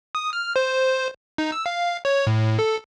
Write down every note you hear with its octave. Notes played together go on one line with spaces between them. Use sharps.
D#6
F6
C5
D#4
E6
F5
C#5
A2
A4